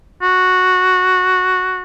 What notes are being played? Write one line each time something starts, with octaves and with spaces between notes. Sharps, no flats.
F#4